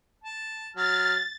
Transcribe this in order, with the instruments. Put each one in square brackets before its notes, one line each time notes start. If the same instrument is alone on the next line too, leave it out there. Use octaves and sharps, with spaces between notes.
[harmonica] A5
[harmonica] F#3 F6 [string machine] A6